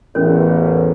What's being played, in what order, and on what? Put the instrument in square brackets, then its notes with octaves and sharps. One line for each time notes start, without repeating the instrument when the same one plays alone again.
[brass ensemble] A1 E2 [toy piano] C#4 A#4 C#5